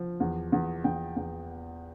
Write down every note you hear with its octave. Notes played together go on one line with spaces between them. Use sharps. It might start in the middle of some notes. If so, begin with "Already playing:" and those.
Already playing: F3
E2
E2
E2 G5
E2